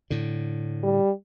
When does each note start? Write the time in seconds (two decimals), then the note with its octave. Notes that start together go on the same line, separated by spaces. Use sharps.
0.10 A2 D3
0.83 G3